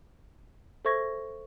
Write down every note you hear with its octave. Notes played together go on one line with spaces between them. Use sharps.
A4 C5 E5 C#6 G#6 A#6